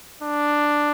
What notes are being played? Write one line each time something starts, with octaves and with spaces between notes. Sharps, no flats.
D4